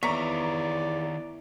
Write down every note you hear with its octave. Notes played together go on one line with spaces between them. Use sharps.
E2 D#3 C#5 D5 A#5 C#6 B6